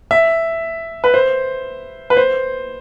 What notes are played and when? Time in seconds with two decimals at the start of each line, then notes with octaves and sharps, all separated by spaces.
0.11 E5
1.04 B4
1.14 C5
2.10 B4
2.17 C5